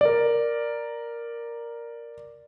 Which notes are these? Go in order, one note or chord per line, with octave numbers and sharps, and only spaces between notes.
A#4 D5